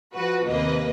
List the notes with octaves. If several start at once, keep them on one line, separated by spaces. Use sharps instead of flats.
F3 F#4 B4
D#2 C3 A#3 B4 D#5